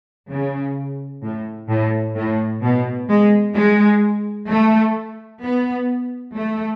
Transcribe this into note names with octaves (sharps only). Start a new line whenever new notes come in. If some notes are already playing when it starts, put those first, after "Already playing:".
C#3
A2
A2
A2
B2
G#3
G#3
A3
B3
A3